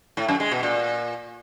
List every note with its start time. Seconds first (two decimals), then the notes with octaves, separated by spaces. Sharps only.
0.17 A2
0.29 F#2
0.40 G#3
0.51 B2
0.63 A#2